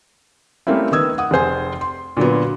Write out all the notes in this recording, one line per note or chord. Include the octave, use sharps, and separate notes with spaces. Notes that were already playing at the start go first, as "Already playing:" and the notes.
G3 A3 A#3 C4 C#4 E4
D#3 B3 A#4 D#6 E6 G#6
F#5 D#6
F1 G#4 C5 G#5
C6
A#2 D3 F#3 B3